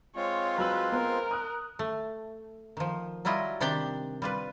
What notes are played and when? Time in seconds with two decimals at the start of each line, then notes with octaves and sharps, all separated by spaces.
0.16 G#3 C4 F4 C#5
0.58 F#3 B4 E6 F#7
0.92 B3 A#4 C5
1.31 D#6 F#6
1.79 A3
2.77 D#3 F3
3.25 F#3 G3 E4 F4 D#5
3.61 C3 D#3 D4 G4 D5 G5
4.22 G3 F4 B4